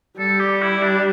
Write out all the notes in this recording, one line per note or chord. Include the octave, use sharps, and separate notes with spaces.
G3 A4
G4
E4
D4